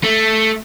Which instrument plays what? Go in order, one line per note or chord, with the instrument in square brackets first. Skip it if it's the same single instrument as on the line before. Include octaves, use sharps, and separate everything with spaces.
[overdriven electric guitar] A3